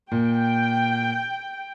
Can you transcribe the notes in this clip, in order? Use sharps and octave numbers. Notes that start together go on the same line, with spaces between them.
A#2 G5